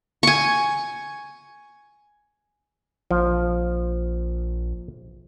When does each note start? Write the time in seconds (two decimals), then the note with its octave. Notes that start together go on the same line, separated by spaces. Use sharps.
0.23 G#5 C#6
3.11 A#1 F3